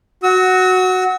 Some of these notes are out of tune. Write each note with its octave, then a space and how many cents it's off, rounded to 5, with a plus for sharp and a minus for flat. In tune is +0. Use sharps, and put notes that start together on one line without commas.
F#4 +0 E6 -40